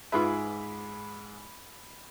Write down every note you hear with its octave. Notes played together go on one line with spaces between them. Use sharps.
G#2 F4 G#4 B4 E5 B5 D6